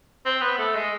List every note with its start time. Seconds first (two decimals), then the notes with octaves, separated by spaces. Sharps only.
0.26 C4
0.41 B3
0.58 A3
0.75 G#3